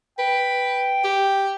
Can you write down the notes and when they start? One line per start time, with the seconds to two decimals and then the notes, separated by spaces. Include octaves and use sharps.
0.19 B4 G5
1.04 G4